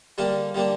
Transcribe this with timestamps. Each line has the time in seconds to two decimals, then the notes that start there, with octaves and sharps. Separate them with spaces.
0.18 D3 G3 A#3 D4 F5
0.54 D3 G3 A#3 D4